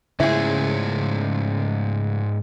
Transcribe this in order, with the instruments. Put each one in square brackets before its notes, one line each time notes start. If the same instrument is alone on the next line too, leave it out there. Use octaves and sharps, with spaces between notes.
[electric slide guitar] G#2 C#4 C5 [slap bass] C#3 A3 [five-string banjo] E4 G#4